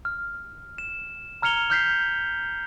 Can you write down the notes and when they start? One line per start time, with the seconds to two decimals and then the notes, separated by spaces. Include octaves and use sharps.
0.05 F6
0.78 E7
1.42 A#5 F6 G#6 C#7 F7 G7
1.70 F6 G6 B6 C7